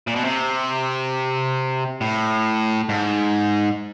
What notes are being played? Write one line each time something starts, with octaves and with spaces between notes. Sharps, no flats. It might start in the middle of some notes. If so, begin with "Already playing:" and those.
A#2
B2
C3
A2
G#2